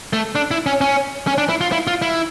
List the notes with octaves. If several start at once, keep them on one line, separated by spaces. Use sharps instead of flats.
A3
D4
E4
C#4
C#4
C#4
D4
E4
F4
E4
F4
E4